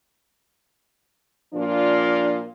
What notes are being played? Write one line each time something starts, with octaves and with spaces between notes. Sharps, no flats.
A#2 F3 D4 F4